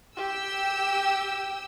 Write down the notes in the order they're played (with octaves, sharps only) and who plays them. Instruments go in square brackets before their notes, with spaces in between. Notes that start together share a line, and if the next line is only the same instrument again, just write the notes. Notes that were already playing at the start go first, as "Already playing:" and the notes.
[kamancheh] G4 [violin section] G5 E6